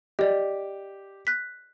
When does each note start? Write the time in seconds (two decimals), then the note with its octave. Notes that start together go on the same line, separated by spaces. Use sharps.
0.19 G4 D5 D#5
1.27 F#6 B6